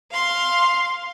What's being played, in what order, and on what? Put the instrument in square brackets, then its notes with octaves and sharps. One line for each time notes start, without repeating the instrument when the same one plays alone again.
[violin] F5 C6